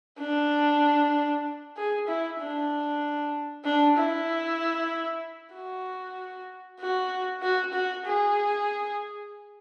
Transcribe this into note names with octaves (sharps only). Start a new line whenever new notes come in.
D4
G#4
E4
D4
D4
E4
F#4
F#4
F#4
F#4
G#4